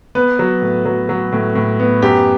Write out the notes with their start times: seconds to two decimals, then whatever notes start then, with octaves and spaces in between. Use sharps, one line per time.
0.15 B3 B4
0.39 F#3
0.62 A2
0.85 F#3
1.09 F#3
1.32 A2
1.55 A2
1.80 B3
2.02 F#2 G4